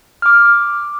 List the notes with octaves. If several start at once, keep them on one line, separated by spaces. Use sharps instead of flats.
D6 F6